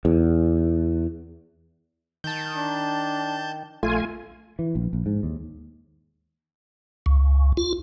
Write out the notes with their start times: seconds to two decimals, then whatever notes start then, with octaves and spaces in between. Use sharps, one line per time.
0.05 E2
2.24 D#3 A5 G6
2.55 D4
3.83 A#1 A3 F4 G#5
4.59 E3
4.75 A#1
4.93 A#1
5.06 G#2
5.23 D#2
7.06 C#2
7.57 F4